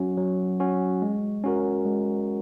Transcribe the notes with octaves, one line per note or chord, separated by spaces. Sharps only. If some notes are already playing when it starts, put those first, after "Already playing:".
Already playing: F#3 C#4 F#4
F#3
C#4 F#4
G#3
C#4 F#4 A#4
G#3